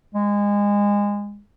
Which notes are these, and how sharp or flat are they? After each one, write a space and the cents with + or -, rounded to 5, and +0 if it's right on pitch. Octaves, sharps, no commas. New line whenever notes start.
G#3 -25